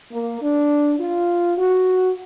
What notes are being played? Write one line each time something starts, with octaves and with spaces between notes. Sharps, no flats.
A#3
D4
F4
F#4